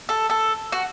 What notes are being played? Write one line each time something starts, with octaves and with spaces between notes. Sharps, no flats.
A4
A4
F#4